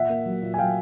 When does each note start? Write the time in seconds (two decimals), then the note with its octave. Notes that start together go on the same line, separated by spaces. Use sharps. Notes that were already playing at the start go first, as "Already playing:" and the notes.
Already playing: A#2 E5 F#5
0.10 A#3
0.25 F#3
0.42 A#2
0.54 G#5
0.59 F#3 F5 G5